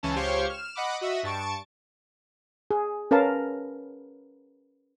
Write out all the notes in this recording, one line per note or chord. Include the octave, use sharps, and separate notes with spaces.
C#2 E3 C#4 A5
C#2 G4 C5 C#5 F5 C#6
F6 E7
D#5 F#5 B5 D6
F#4 D#5 E5
G2 A5 C#6 D7
G#4
C#4 A#4 B4 F5 A5